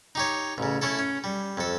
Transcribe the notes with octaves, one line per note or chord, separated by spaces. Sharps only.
D#4 G4 C#5
A1 C#3
A3 C#4 E4 A4
C#4
G3
F2 A4